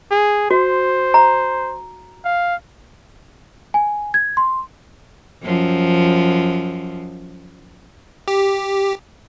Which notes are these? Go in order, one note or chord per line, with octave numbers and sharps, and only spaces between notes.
G#4
F#4 C5
A#5
F5
G#5
G#6
C6
F#2 F3
G4